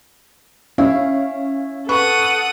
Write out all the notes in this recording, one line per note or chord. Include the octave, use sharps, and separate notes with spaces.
C#4 E4 F5
A4 B4 F#5 C#6 D#6